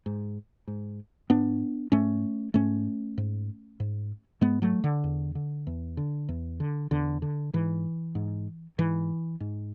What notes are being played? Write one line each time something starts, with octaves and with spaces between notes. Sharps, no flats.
G#2
G#2
G#2 B3 D4
G#2 A3 C#4
G#2 A3 C#4
G#2
G#2
G#2 G#3 B3
F#3 A3
D3
E2
D3
E2
D3
E2
D3
E2 D3
D3
G#2 E3
G#2
G#2 E3
G#2